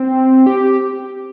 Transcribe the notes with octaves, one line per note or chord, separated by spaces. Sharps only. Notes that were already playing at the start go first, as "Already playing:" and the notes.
Already playing: C4
G4